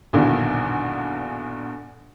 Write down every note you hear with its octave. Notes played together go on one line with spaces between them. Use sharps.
A#1 E2 G2 B2 D3 D#3